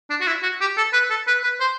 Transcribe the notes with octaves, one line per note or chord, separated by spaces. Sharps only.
D4
F#4
E4
F#4
G4
A4
B4
A4
B4
B4
C5